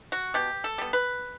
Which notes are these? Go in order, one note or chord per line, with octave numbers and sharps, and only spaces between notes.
F#4
B2 G4
A4
G3 B3
B4